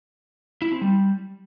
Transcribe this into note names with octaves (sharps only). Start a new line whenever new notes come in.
E4
C4
G3